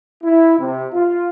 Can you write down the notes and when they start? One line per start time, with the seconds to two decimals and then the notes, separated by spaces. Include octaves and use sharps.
0.23 E4
0.58 C3
0.93 F4